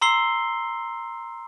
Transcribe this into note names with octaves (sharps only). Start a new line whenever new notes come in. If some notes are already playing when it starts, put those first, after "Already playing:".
A#5 C6 E6 C7 G7